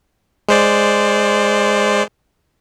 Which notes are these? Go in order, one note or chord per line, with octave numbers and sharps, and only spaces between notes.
G#3 C5 D5